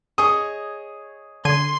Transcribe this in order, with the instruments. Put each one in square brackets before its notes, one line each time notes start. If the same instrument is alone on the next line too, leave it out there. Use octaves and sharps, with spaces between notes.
[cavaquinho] G#4 C#5 D#5 [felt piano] D#6
[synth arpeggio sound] D3 G#6 D#7 [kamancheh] C6